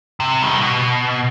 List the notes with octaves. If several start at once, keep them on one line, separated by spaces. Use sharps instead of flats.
C3
D#3 G3
B2